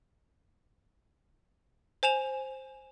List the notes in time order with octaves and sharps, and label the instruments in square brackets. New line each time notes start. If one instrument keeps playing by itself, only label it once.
[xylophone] C5 G#5 E7 F7